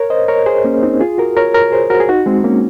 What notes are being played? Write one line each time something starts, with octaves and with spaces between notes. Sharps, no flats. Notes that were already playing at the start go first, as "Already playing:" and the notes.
Already playing: A#4 C#5
C5 D#5
A#4 C#5
G#4 C5
A#3 C#4
C4 D#4
F4 G#4
F#4 A#4
A#4 C#5
A#4 C#5
G#4 C5
F#4 A#4
G#4
D#4 F#4
G#3 C4
A#3 C#4